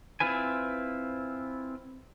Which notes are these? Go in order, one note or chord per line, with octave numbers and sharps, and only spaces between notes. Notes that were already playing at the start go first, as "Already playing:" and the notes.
C4 E4 F4 B4 G#5